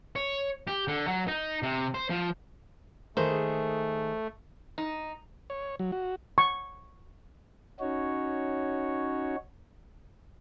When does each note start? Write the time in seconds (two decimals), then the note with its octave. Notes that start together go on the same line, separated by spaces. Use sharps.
0.16 C#5
0.67 G4
0.88 D3
1.07 F#3
1.28 D#4
1.63 C3
1.94 C5
2.10 F3
3.17 D#3 A3 A#3 G#4 C5
4.78 D#4
5.50 C#5
5.79 F#3
5.92 F#4
6.38 C#6
7.80 C#4 D#4 F#4 C#5